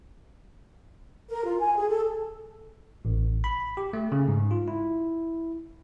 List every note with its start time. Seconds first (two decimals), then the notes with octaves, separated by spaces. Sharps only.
1.30 A#4
1.45 F4
1.60 G#5
1.76 G#4
1.89 A4
3.05 A1
3.44 B5
3.77 G4
3.93 A3
4.12 C#3
4.28 G#2
4.51 F4
4.68 E4